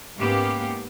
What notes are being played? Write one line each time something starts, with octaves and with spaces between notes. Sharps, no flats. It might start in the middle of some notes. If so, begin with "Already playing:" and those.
G#2 A#3 B3 C#4 G4 F5